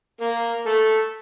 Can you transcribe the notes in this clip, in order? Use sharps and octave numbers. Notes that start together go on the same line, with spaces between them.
A#3 A#4
A3 A4